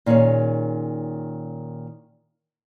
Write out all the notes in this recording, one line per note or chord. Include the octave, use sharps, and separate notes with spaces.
A#2 D#3 C#4 G#4 C#5